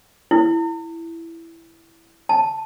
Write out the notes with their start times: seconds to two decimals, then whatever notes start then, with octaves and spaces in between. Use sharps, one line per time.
0.31 E4
2.29 A5